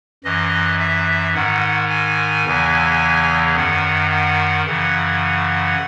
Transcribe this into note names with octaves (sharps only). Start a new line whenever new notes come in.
F#2 E3 D#5
E5
G#2 D#3 F#5
G#5
E2 C#3 E3
F#2 D#3 F#5
F#5
F#2 C#3 E3 F#5